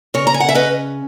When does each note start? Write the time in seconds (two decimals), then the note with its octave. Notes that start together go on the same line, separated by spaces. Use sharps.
0.14 C#3 A#4 C#5
0.27 A#5
0.34 G#5
0.40 F#5
0.49 E5
0.54 C#4 B4 D#5